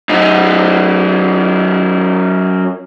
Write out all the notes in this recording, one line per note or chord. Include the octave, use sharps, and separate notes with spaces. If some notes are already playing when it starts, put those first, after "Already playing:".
F#2 D#4